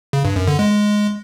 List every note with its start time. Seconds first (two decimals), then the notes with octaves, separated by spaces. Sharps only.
0.13 C#3
0.25 G2
0.36 F#2
0.48 D3
0.59 G#3